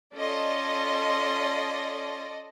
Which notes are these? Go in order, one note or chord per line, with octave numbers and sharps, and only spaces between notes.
C#4 F4 A4 D5 D#5 C6